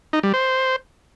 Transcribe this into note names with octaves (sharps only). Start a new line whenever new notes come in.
D#4
G3
C5